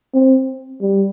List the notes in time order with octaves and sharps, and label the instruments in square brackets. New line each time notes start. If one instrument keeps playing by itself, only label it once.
[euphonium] C4
G3